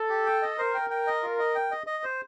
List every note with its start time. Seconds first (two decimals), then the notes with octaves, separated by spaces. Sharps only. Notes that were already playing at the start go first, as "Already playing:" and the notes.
Already playing: A4
0.09 G4
0.26 G5
0.42 D#5
0.58 A#4 C5
0.74 G5
0.90 G5
1.07 D#5
1.23 F4
1.39 D#5
1.55 G5
1.71 D#5
1.87 D#5
2.04 C5